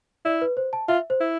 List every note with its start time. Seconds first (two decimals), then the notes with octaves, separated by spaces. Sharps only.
0.25 E4 D5
0.41 B4
0.57 C5
0.73 A5
0.88 F4 E5
1.10 C5
1.20 E4